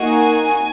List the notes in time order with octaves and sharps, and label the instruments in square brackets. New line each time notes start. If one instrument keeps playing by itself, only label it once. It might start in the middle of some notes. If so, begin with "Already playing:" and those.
Already playing: [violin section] A#3 D#4 F#4 G#5